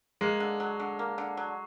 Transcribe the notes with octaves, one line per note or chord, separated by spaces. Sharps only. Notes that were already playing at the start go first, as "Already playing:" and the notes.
G#3 A#3
D3
F#3
D3
A#3
D3
F#3